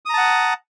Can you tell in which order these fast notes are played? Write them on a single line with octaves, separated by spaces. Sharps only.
D#6 A#5 A5 F#5